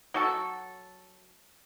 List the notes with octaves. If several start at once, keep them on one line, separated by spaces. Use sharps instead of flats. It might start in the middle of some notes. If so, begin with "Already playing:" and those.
F#3 F#4 A4